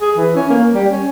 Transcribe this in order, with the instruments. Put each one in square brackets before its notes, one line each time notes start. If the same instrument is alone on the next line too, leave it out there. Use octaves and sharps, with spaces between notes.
[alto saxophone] G#4
E3
C#4
A#3
G3
C#4